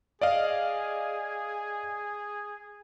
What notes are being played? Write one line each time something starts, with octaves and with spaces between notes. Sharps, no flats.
G#4 D5 D#5 F5